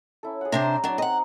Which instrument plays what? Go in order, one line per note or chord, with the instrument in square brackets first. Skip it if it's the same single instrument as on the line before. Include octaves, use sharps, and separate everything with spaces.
[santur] C#4 E4 A4
G#4 F#5
[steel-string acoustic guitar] C3 D4 C5 [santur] A#5
[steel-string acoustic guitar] F#3 D4
[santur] C4 D#4 G#4 [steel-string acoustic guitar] D#5 F#5